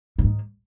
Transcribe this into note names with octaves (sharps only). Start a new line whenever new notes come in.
A2
G#2